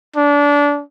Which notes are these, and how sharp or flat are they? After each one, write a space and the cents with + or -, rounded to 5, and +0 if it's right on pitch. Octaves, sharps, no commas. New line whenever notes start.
D4 -25